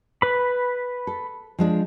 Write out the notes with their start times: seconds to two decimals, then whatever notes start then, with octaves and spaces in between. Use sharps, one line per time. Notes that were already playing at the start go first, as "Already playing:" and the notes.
0.22 B4 B5
1.07 A4
1.59 F3 G#3 D4